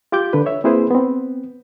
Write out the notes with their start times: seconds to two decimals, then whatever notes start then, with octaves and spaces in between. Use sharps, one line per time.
0.12 F4 G4 D6 G6
0.33 D3 B4
0.46 C#5 E5
0.64 A#3 C4 E4 G#4 B4 C5
0.91 B3 C4